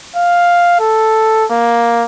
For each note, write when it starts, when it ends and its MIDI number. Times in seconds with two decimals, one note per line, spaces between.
0.16 0.78 77
0.80 1.45 69
1.51 2.05 58